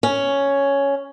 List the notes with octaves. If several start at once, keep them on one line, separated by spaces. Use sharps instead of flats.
C#4